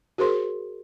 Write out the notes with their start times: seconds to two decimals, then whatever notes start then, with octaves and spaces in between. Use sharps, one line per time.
0.18 F#4 G#4 A#4 C5 C6